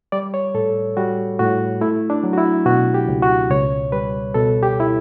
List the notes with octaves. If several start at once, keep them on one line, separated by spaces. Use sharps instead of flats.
G3 D5
C#5
A2 A4
G3 F#4
A2 F#4
A3 E4
D4
F#3
F#4
E4
B2 F#4
G4
C#2
F#4
C#2 C#5
G3 B4
B2 A4
G4
E4